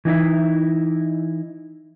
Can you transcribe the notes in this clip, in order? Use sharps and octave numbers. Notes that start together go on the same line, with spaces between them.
E3 D#4 E4 E5